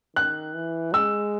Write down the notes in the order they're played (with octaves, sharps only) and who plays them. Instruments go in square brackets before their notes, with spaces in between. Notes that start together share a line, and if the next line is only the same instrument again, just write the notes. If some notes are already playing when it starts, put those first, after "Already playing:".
[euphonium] D#3 [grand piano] F#6
[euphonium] E3
[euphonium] G#3 [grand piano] E6